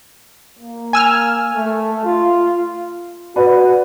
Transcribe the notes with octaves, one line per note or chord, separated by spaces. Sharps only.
A#3
G#5 E6 F6
A3
F4
F#4 B4 D5